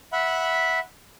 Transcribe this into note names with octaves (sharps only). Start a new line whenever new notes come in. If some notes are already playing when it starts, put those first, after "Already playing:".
E5 F#5 B5